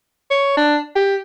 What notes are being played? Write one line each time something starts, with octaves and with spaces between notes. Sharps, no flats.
C#5
D4
G4